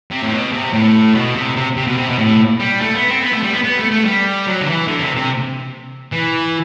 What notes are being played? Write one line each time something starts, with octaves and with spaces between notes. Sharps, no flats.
C3
A2
B2
C3
A2
B2
C3
C3
C3
B2
C3
B2
A2
G3
A3
B3
C4
B3
A3
G3
B3
B3
A3
A3
G3
F#3
D3
E3
D3
C3
C3
E3